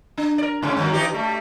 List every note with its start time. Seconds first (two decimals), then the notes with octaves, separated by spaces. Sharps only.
0.18 D4
0.38 A#4 D5
0.62 G#2 C#3 C#4
0.77 G2 D#3 F#3
0.93 E3 D#4 G4
1.13 G3 A3